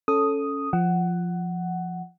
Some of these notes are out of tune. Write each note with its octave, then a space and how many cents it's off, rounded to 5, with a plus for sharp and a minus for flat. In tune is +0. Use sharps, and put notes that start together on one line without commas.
C#4 +0 A4 +0 D#6 +0
F3 +0 F#5 +10